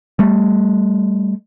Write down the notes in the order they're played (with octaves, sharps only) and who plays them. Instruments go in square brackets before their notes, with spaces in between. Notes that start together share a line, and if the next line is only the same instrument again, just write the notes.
[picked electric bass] G3 A3